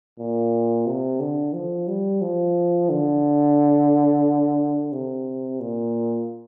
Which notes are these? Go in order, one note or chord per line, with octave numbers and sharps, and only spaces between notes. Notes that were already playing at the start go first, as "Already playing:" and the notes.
A#2
C3
D3
F3
G3
F3
D3
C3
A#2